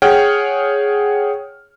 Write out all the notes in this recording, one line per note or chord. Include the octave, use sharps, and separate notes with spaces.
G#4 C#5 F#5 G5 F6